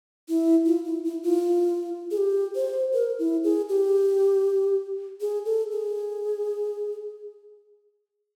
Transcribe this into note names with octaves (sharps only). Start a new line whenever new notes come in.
E4
F4
E4
E4
F4
G#4
G4
C5
A#4
E4
G#4
G4
G#4
A4
G#4